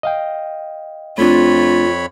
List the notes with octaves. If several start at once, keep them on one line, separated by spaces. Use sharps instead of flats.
D#5 F5 G5
F2 A3 C4 D4 F4 C#5 B5